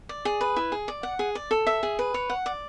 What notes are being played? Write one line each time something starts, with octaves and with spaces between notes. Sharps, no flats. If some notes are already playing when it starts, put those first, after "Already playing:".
D5
G#4
B4
E4
G#4
D5
F#5
G#4
D5
A4
E5
G#4
B4
C#5
F#5
D5